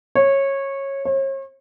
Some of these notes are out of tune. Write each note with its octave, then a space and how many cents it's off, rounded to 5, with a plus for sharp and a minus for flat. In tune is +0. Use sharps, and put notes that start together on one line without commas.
C#5 -15
C#5 -40